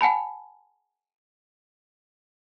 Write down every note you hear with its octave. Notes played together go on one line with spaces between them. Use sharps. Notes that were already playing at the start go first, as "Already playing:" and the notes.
F#5 G#5 A5 B5